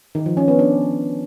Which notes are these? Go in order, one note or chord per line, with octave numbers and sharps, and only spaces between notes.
D#3
F3
C#4
B3
D4